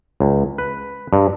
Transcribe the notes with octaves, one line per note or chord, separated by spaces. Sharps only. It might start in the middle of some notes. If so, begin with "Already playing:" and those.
C#2
B4
G2